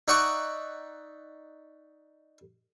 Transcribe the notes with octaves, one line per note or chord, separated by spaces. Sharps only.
D#4 D5 E5 F#5 C#6 D#6